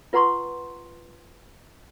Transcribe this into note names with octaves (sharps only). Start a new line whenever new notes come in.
F4 B4 F#5 A#5 C6 C#6